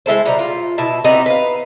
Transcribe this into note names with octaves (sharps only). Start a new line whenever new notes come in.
G#3 E4 A4 C5
B2 G3 A#5
F4
B2 E4 A5
G3 B3 C4 D#4
B4 F5